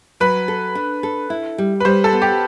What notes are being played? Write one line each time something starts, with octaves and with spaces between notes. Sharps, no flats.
F#3 B4
A4
D4
A4
E4
G3
B4
G3 C5
A4
B3
G4